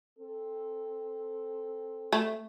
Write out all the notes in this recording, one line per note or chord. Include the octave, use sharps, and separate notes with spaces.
C4 A4
A3